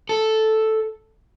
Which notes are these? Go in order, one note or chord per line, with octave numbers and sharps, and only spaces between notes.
A4